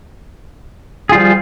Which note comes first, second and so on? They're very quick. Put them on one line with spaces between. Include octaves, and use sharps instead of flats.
G#4 F4 G3 F3